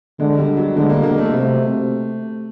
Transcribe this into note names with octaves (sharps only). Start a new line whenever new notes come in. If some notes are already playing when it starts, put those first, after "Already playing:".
D3 G#3
G3
F#3
D3 G#3
A#3
A#3
A3
C3